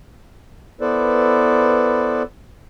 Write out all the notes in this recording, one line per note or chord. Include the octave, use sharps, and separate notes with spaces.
B3 E4 A4 B4 C5 D5